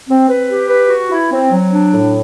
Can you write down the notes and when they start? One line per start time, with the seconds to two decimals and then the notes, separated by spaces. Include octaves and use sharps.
0.09 C4
0.29 B4
0.49 G4
0.69 B4
0.90 F#4
1.10 E4
1.31 C4
1.51 F#3
1.71 D4
1.91 A2